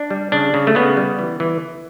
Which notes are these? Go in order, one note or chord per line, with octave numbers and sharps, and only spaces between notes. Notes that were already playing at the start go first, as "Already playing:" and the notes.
Already playing: D4
G3
C#3 D4
C#3
A3
C#3 B3
G3
E3
E3